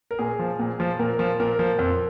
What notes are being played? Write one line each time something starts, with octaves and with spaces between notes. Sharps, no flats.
A#4
A#2 G#4
F3
A#2
F3
A#2 A#4
F3
A#2 A#4
F3
F2